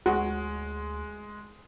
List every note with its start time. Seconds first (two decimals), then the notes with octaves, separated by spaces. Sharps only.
0.06 D2 G#3 F#4